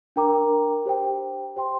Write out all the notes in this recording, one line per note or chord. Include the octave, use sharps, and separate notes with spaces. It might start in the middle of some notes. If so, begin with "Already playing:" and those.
D4 A#4 G5 A#5 D6
G4 C5 G5
G4 C5 G5 C6